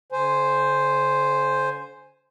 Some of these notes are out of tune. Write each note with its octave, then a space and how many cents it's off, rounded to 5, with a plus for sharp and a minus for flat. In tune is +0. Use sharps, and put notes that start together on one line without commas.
D3 -45 C5 +0 G#5 +0